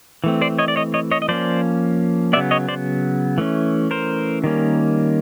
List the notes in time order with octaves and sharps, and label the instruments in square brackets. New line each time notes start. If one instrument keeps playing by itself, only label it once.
[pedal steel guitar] E3 A3 C4
C5 D5
C#5 D#5
D5
C#5 D#5
C#5 D#5
C#5 D#5
D#5
F3 A#3 C#4 C5 D5
C#3 F#3 B3 D5 E5
C#5 D#5
C5 D5
E3 A3 C#4
A#4 C5
D#3 G3 A#3 C#4